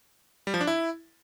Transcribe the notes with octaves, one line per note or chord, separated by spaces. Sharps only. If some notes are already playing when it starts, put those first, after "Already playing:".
G3
F3
D4
E4